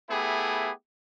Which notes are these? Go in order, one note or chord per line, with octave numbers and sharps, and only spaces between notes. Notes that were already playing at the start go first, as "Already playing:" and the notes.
A3 B3 E4 G4 G#4